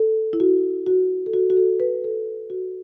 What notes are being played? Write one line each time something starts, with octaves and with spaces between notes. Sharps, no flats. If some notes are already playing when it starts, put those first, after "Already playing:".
Already playing: A4
E4
F#4
F#4
A4
F#4
F#4
A4
B4
A4
F#4